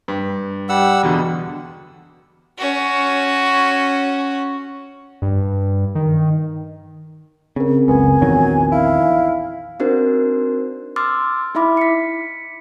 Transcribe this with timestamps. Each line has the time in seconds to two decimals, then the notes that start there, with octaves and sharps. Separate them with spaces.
0.08 G2
0.69 G3 F#5 E6
1.03 E2 B2 D3
2.58 C#4 F#4
5.22 G2
5.95 D#3
7.56 C#3 C4 A#4
7.88 F#1 C#2 B3 G#5
8.21 A#1 E2 D#3 F#3
8.72 E4 F5
9.80 C4 D4 D#4 F#4 A#4 C5
10.96 C6 D6 E6 F6 A6
11.55 D#4 E4 E5 B5 D6
11.77 B6 C#7